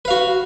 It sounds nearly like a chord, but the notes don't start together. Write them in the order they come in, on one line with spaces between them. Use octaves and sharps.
B4 F5 F#4